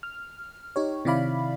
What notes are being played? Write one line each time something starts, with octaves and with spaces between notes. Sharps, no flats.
F6
D#4 G4 C#5
C3 D#3 E4 D5 F5 B5